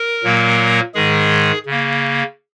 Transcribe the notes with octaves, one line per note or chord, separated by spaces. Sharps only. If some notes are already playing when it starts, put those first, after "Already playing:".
Already playing: A#4
A#2 F#3 A#3
G#2 D#3 G#3 G#4
C#3 A#3